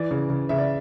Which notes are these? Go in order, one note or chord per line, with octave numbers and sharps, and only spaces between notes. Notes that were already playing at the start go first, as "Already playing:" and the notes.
Already playing: E3 D5
C#3
C#3
C#3 E5
D5